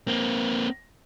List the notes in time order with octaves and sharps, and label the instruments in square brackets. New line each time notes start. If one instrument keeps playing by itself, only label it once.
[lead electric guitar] A#3 C4